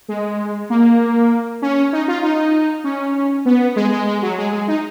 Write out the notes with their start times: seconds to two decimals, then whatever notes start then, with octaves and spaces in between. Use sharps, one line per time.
0.08 G#3
0.70 A#3
1.62 C#4
1.93 D#4
2.08 F4
2.23 D#4
2.84 C#4
3.45 B3
3.76 G#3
3.92 G#3
4.07 G#3
4.22 F#3
4.38 G#3
4.53 G#3
4.68 D#4